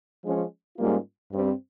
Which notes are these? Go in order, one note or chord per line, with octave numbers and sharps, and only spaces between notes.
F3 G#3 C#4
G#2 G3 A#3 C#4 F4
G2 G3 C4